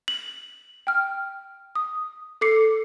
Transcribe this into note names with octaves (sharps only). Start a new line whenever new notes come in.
F#7
G5 F6
D#6
A4 D6 C7 C#7